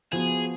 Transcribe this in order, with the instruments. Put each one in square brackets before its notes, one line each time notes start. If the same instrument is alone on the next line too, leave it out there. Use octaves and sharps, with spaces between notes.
[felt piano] F3 B3 F#4 [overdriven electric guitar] G#4